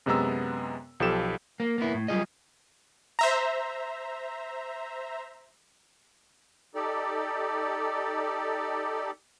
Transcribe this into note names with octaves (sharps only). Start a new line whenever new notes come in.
F#2 C3 G#3 B3 A#5 E6
B1 F3 G4 A4 E7
A#3
A#3 B3 E4
A2
F#3 G3 F4 G#4 D#5
C5 E5 A#5
D#4 G4 A4 D5